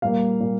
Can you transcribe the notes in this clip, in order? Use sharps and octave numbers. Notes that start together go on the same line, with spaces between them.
A#2 G3 A#3 F5
A#2 G3 A#3